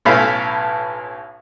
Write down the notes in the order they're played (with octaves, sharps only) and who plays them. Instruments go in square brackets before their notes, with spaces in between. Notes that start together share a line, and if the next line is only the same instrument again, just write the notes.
[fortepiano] B1 A2 C#4 A4 F5 B5